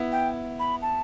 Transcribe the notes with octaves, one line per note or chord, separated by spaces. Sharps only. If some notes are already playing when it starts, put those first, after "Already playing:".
Already playing: B3 E4
G5
B5
A5